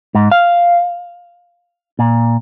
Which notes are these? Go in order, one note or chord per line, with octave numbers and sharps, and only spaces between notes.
G#2
F5
A#2